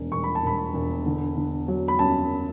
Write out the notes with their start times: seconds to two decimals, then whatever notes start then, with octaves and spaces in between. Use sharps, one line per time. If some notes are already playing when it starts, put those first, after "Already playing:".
Already playing: E1
0.12 E1 C#6
0.24 B5
0.35 A5
0.43 E1 B5
0.74 E1
1.06 D3
1.36 D3
1.68 F#3
1.88 B5
1.99 F#2 A5